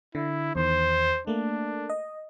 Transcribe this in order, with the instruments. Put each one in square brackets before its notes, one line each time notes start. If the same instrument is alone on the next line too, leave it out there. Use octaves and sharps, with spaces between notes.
[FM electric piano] D3 [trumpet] E4
[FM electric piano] E2 D#3 [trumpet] C5
[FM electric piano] A3 A#3 [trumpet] D4
[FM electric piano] D#5